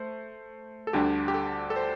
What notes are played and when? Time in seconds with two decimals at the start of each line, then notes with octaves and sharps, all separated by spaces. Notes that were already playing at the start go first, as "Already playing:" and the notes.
Already playing: A3 C5
0.87 A4
0.93 D2 D3 G3 D4 G4
1.28 G4
1.34 A4
1.70 A4
1.76 C5